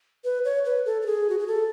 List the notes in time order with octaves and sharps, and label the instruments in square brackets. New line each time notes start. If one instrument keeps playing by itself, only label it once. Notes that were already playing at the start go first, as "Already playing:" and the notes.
[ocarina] B4
C#5
B4
A4
A4
G#4
F#4
G#4
A4